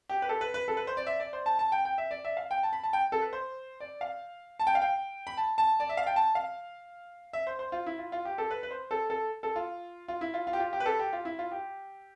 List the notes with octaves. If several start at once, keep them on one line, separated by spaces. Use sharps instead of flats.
G4
B4
A4
B4
B4
A4
B4
C5
D5
E5
D5
C5
A5
A5
G5
G5
E5
D5
E5
F5
G5
A5
B5
A5
G5
A4
B4
C5
D5
F5
A5
G5
F5
G5
B5
A5
A5
D5
E5
F5
G5
A5
F5
E5
C5
C5
F4
E4
F4
F4
G4
A4
B4
B4
C5
A4
A4
A4
F4
F4
E4
F4
F4
G4
F4
G4
B4
A4
G4
F4
E4
F4
G4